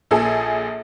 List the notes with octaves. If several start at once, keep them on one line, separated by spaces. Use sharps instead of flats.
A#1 G#4 A4